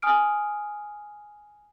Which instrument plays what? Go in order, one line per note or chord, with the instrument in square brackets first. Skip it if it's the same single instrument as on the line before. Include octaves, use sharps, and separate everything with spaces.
[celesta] G#5 D#6 F6 D7